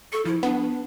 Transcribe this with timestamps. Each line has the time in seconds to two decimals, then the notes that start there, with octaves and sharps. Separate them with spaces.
0.13 A4 C#6
0.25 F3 E4
0.43 B3 D4